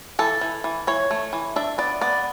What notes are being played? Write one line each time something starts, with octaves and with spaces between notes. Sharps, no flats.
E3 A4
E3
E3
E3 C#5
A3
E3
D4 E5
B3 D5
B3 D5